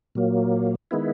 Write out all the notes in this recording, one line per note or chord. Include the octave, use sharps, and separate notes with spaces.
A#2 F#3 A#3
D#3 G#3 B3 E4